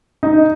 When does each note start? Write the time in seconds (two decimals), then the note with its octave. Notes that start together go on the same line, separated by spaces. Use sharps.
0.23 D#4